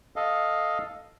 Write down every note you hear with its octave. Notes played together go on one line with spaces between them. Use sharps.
A4 D#5 F5